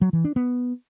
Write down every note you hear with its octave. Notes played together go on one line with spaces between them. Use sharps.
F#3
E3
D4
B3